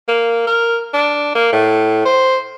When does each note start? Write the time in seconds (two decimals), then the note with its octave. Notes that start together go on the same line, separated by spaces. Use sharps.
0.08 A#3
0.47 A#4
0.94 D4
1.35 A#3
1.53 A2
2.05 C5